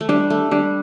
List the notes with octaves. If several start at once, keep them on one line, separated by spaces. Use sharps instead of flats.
A3
G3 D4
A3
G3 D4